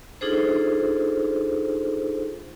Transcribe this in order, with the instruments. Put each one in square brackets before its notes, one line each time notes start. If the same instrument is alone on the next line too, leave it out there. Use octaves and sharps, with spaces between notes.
[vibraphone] D4 D#4 F4 G#4 A4 C5